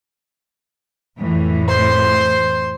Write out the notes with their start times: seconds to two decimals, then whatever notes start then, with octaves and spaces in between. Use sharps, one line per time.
1.18 F2 A2 E3
1.68 C5 C6